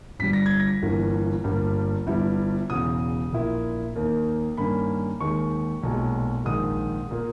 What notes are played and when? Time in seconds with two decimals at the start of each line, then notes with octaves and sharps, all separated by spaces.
0.19 G1 G2 G3 B6
0.33 A#6
0.46 G#6
0.60 A#6
0.82 G1 G2 E3 A#3
1.44 G1 G2 G3 A#3
2.06 G1 G2 G3 B3 E4
2.69 E1 E2 C#3 D#6
3.32 A#1 A#2 A#3 E4
3.95 D#2 D#3 A#3
4.57 G2 D#3 A#3 C#4 B5
5.20 D#2 D#3 G#3 C#6
5.83 B1 A#2 G#3
6.45 A#1 G#2 D#3 G#3 D#6
7.11 A#2 A#3